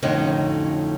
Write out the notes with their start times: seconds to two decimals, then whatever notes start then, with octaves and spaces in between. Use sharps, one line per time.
0.02 F2 A2 D3 F#3 C#4 D#4